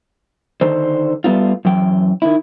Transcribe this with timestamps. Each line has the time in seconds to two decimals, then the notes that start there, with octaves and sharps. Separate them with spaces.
0.61 D3 D#3 C5
1.24 G3 A3 B3 F4
1.65 F#2 E3 G5
2.22 D#3 E4